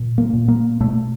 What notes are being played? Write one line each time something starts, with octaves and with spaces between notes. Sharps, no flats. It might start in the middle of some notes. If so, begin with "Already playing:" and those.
Already playing: A#2
A#3
A#2
A#3
B2 A3